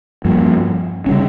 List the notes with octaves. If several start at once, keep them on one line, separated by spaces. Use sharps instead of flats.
G2 F3 A#3
C#3 G3 C#4